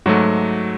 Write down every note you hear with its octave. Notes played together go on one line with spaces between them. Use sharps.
G#2 F#3 A3 F#4